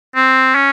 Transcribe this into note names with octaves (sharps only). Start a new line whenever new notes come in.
C4
C#4